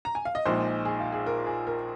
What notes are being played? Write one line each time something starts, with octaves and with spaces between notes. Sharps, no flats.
A#5
G#5
F5
D#5
A#1 A#2 F3 G#3 D#4 C5
G#4
F4
G#4
A#4
G#4
A#4